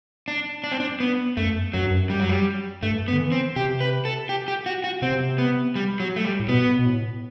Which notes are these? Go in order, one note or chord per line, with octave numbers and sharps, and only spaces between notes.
D4
D4
C4
D4
B3
F#2 A3
F#2 F#3
G2
F#2
G3
F#3
G3
G2 A3
B3
D3
E3
C4
C3 G4
B4
A4
G4
G4
F#4
F#4
C3 C4
B3
G3
F#3
A3
G3
A2
B2 B3
B2
A2